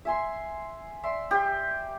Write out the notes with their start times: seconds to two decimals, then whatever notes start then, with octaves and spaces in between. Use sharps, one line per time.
0.05 E5 G#5 C6
1.03 D5 E5 C6
1.31 G4